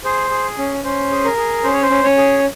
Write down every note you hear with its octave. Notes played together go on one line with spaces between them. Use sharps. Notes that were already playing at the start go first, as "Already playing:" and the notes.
G#4 C5
G#4
C#4
C#4 C5
G#4
A#4
G#4
C#4 C5
C#5
C5
C#4
C#4 C#5
G#4